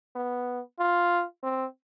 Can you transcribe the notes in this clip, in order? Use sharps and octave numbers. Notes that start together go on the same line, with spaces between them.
B3
F4
C4